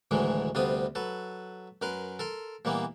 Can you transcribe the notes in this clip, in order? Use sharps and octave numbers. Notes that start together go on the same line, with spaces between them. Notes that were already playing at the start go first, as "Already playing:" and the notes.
D2 A2 D#3 E3 F#3 G#3
D2 C3 G3 B3 F4 D#6
F#3 A4 B4
F#2 A#4 B4 C6
A4 A#4 C6
A#2 E3 G3 A#3 B3